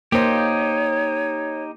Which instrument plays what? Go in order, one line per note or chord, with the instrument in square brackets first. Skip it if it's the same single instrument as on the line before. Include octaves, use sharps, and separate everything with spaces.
[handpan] A#3 C5 [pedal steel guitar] D#4 G4 [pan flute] C#5